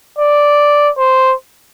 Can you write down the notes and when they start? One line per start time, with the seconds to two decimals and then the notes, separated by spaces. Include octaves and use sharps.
0.19 D5
0.98 C5